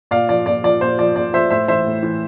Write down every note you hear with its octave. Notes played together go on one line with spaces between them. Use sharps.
A#2 D5 F5
F3 D5
A#2 D5
F3 D5
A#2 C5
F3 D5
A#2 D5
F3 C5 E5
A2 C5 E5
E3 C5 E5
A2
E3